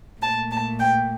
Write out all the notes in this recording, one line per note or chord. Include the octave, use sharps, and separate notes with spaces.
A#2 A3 A5
A5
G5